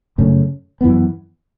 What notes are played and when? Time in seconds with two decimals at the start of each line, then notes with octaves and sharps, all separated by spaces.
0.18 F#2 C#3 A3 C#4
0.81 F#2 E3 B3